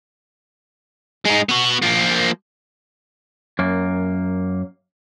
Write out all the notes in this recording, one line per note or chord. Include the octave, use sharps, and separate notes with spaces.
G#3 D#4
B3 F#4
F3 A#3
F#2 A#3